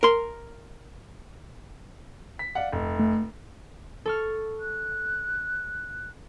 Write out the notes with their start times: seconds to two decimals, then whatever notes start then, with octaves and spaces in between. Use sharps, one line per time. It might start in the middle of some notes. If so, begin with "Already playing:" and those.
0.03 A#4 C6
2.39 B6
2.55 D5 F5 F#5
2.72 F1
2.99 A3
4.06 A4 C#6 F6
4.60 F#6